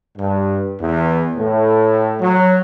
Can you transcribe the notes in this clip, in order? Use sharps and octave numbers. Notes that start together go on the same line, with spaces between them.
G2
E2
A2
F#3